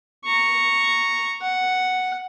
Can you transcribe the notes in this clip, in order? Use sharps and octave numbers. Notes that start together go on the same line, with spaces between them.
A#5 C#6
F#5